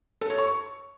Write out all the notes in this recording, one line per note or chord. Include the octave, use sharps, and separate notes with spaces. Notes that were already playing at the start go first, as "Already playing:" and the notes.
A4
C#5
C#6